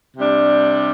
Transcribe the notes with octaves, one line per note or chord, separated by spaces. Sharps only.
C3 G3 D4